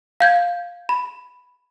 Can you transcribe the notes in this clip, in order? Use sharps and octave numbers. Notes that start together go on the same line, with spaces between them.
F5 G6 G#6
B5